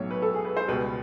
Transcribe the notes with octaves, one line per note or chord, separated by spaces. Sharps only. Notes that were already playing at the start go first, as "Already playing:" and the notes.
Already playing: B1 A2 F#3 C#5
B4
A4
G#4
B4
C5
C#2 B2 G3 B4